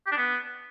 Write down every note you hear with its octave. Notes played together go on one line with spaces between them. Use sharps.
G4
D4
B3